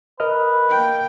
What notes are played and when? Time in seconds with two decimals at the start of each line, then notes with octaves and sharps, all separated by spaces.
0.20 A#4 B4 D#5 F6
0.69 A#3 G5